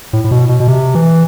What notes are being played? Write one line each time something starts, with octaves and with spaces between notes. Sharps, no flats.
A2
A2
B2
B2
B2
C3
E3